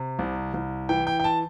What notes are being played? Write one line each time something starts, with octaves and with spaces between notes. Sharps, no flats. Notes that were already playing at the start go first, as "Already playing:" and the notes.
Already playing: C3
C2
C2
E3 G5
G5
G5
A5